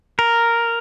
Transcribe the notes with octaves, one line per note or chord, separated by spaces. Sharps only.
A#4